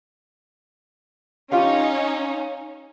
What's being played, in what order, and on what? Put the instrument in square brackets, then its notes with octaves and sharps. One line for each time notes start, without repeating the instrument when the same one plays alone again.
[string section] C#4 D#4 [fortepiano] F4 G4 F5